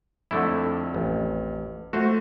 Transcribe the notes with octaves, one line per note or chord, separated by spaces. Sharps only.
F2 D3 A3 E4
A1
A3 F#4 C5